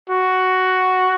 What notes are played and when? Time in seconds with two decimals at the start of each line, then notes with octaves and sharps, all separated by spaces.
0.10 F#4